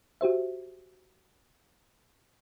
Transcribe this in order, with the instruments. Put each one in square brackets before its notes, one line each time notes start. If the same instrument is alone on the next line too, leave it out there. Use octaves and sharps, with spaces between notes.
[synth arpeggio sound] F#4 G4 C5 E5